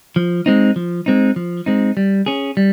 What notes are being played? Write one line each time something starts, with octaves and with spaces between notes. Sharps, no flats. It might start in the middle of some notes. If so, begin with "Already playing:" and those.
F3
G#3 C4 D#4
F3
G#3 C4 D#4
F3
G#3 C4 D#4
G3
C#4 G#4
G3